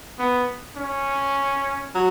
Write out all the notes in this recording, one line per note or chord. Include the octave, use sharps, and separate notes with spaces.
B3
C#4
F#3